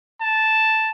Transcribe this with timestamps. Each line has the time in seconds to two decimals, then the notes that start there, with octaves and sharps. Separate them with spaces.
0.21 A5